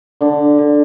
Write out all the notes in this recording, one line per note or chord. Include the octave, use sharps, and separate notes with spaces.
D3 D4
D3